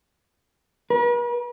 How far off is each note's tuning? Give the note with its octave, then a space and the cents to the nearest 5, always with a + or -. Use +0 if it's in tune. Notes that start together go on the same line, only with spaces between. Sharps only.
B4 -45